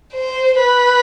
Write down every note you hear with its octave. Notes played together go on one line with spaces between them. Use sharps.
C5
B4